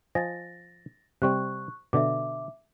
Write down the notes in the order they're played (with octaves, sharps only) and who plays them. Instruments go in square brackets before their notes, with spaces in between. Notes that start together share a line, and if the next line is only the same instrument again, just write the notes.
[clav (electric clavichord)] F3 D#5 G#5 [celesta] A6 A#6
[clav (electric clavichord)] C3 G3 C4 [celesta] C#6 F#6
[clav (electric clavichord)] B2 D3 [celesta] E5 D6